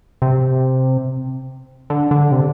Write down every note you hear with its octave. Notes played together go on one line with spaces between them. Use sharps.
C3
D3
D3
C3